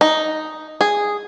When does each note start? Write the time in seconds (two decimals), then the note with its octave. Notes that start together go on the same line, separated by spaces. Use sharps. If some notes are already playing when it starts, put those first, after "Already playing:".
0.01 D#4
0.81 G#4